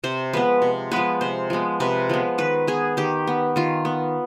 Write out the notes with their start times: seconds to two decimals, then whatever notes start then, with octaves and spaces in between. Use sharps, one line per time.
0.04 C3 C5
0.33 F3 G#3 B3 B4
0.62 C3
0.92 F3 G#3 B3 B4
1.21 C3 C5
1.50 F3 G#3 B3
1.80 C3 B4
2.10 F3 G#3 B3
2.38 D#3 B4
2.67 B3 G#4
2.97 D#3 G4
3.27 B3
3.56 D#3 F4
3.85 B3